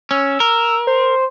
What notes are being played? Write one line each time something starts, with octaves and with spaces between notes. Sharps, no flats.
C#4 E6
A#4
C5